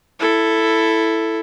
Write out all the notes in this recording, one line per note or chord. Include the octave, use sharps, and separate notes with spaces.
E4 A4